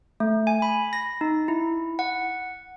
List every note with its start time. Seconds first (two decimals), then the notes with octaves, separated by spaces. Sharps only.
0.20 A3
0.47 G#5
0.62 B5
0.93 A#6
1.21 D#4
1.48 E4
1.99 F#5